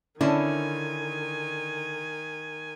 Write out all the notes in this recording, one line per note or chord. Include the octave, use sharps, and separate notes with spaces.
D3 D#3 C#4 D4 E4 G#5